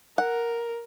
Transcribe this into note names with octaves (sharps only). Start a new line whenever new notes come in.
A#4 F#5